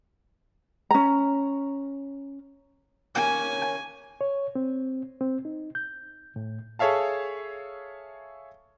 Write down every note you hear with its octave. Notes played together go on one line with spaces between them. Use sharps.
C#4 A#5
A#3 C#4 G#5
C#5
C4
C4
D#4
G6
A2
G#4 A4 C#5 E5 F5 A5